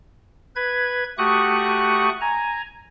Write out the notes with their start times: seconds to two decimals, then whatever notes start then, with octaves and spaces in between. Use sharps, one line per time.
0.56 B4 G#6
1.18 A3 F#4 G4 C#6 D#6 F#6
2.21 G#5 A#5